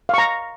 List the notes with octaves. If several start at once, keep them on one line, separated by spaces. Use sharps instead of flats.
F5 A#5 C#6